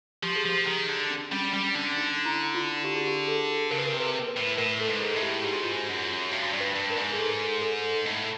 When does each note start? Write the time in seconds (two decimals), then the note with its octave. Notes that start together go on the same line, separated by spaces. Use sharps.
0.23 F3 G4
0.36 G#4
0.45 F3 G4
0.66 D#3
0.89 D3
1.10 D4
1.31 G3 C#4
1.53 G3 C#4
1.75 D3 D4
1.97 D#4
2.25 E4
2.55 F4
2.85 G4
2.96 G#4
3.07 G4
3.28 A4
3.71 C#3 A#4
3.78 B4
3.85 A#4
3.92 C3
4.00 B4
4.28 B4
4.36 A2
4.58 A2 A#4
4.80 A4
4.87 G#2
5.02 G#4
5.16 A2
5.22 G4
5.44 G#2 G4
5.54 F#4
5.64 F4
5.75 F#4
5.88 F#2
6.32 G2 F#4
6.54 G2
6.60 B4
6.75 G2
6.90 A#4
6.96 G#2
7.13 G#4
7.19 A4
7.62 A4
8.06 A2